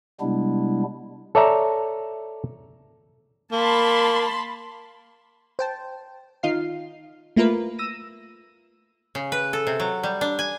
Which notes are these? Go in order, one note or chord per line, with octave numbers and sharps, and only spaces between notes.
C3 G3 G#3 B3 D4 E4
A4 C#5 D5 E5 A#5
A#3 A5 B5 C6
C5 G5 A5
D#3 D#4 F4 F5 C7
A3 A#3 E4 F4 A#4 B4
E6 A#6 D#7
C#3
B4
A4
C3
F#3
G3
D4
G#5